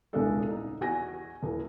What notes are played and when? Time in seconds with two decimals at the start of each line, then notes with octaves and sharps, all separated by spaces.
0.13 D#1 C2 C#3 G#3 D4 A4
0.50 D#4
0.81 E2 F#4 G#5 A#6
1.43 D#1 E3